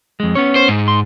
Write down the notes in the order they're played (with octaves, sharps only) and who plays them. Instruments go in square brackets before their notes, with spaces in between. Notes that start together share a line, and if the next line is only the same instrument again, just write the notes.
[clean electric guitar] F2 G#3
B3 C#4 C#5
[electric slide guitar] C5
G#2
[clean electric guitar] C6